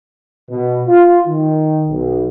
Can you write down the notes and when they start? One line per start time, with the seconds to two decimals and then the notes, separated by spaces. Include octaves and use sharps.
0.49 B2
0.88 F4
1.27 D#3
1.89 B1